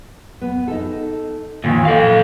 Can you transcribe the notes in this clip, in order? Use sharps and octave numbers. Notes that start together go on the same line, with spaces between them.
B3
D#4 A4
D#2 A#2 E3
A4 F5